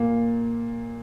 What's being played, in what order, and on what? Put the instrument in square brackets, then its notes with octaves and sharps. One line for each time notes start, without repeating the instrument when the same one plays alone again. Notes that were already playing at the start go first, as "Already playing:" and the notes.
Already playing: [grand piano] A#2 A#3